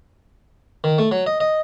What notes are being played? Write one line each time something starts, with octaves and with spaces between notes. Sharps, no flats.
D#3
A3
F#3
D#5
D#5